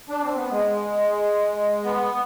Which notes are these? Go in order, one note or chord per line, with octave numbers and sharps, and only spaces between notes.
D4
C4
B3
G#3
B3